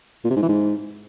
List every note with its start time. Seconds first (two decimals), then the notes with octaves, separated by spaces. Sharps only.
0.24 A#2
0.31 C3
0.37 G#2
0.43 E3
0.49 G#2